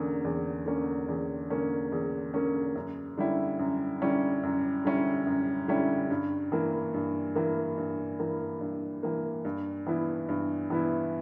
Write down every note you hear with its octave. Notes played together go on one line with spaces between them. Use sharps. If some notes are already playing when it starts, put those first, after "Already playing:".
Already playing: E2 D3 A#3 C#4
E2
D3 A#3 C#4
E2
D3 A#3 C#4
E2
D3 A#3 C#4
F#2
D3 G3 C#4 E4
F#2
D3 G3 C#4 E4
F#2
D3 G3 C#4 E4
F#2
D3 G3 C#4 E4
G2
E3 A#3
G2
E3 A#3
G2
E3 A#3
G2
E3 A#3
G2
E3 B3 E4
G2
E3 B3 E4